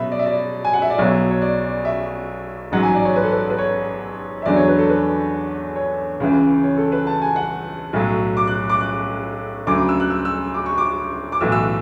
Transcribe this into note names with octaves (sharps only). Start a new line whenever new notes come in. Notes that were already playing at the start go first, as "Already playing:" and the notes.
Already playing: B2 F#3 E5 B5
D5
E5
D5
G#5
F#5
E5
D5
B1 B2 F#3 C#5
C#5
D5
D5
E5
A1 G#2 F#3 F#5
G#5
D5
C#5
B4
A4
B4
B4
C#5
E5
E2 D3 F#3 D5
C#5
B4
A4
B4
C#5
C#2 C#3 E3
C#5
A4
B4
A5
G#5
F#5
B1 A2 F#3
D6
F#6
D6
F#6
D2 C#3 F#3 D6
D6
E6
F#6
E6
E6
D6
C#6
D6
D6
B1 A2 E3 E6
E6